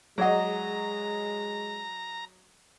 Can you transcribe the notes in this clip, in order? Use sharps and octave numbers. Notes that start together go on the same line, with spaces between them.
F#3 G#3 G#4 D5 D#5 F#5 A#5